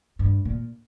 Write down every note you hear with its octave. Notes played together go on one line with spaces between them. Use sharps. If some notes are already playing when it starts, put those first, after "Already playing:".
G2
A#2